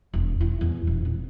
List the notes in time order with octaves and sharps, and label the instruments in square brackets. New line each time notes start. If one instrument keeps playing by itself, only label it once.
[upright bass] E1
E4
E2
E1
F2